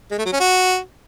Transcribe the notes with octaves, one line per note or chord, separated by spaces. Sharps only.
G#3
A3
F#3
C#4
F#4